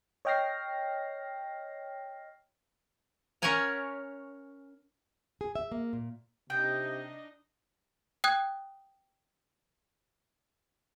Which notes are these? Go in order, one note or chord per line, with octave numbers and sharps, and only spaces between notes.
C#5 D#5 G5 F6 A#6 C7
C#4 A#4 C#5 F#5 G#5 A#5
G#4
E5
A#3
A#2
C3 D4 D#4 D#5 G5
G5 D#6 F#6 G#6